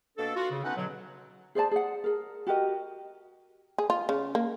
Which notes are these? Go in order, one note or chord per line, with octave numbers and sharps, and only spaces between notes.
B2 A#3 D4 A4
F4 F#4
C#3
A3 B3 C#4 D#4 B4 F#5
B2 D3 F#3
G#4 C5 D5 A5
G#4 D5 F#5
G#4 A#4
F#4 G4 A#4 D#5
G#4
F4
C#3
A#3